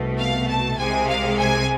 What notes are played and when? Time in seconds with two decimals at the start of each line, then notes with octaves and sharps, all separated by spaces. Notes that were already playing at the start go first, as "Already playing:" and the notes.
Already playing: C2 B2 A3
0.17 F5
0.47 A5
0.77 C2 C3 G#3 G#5
1.07 F5
1.37 G#5